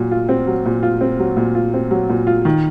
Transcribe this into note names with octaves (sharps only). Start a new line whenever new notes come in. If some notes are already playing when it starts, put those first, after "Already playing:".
Already playing: A#2 F#3
F4
C4
F#3
A#2
F4
C4
F#3
A#2
F4
C4
F#3
A#2
F4
D#3